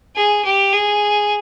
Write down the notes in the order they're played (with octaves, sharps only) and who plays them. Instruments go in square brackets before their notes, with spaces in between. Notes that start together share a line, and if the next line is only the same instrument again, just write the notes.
[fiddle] G#4
G4
G#4